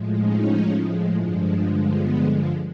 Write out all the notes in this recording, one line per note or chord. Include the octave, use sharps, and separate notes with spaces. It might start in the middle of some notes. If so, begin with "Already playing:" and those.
Already playing: A2 F3 G#3
C#4 D#4
G2 D3 F3 G#3
B3